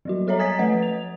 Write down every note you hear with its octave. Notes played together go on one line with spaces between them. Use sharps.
F#3 G3 F#4
F#4 A4 C#5 D#5 E5 A#5
G#5 D#6 G#6 A6 B6
F3 A3 B4 D#5 F#5
F7